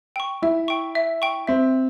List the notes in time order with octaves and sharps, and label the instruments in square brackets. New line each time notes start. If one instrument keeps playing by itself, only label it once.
[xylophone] G5 C#6
[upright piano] E4 [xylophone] E5
[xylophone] G5 C#6
E5
G5 C#6
[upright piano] C4 [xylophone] E5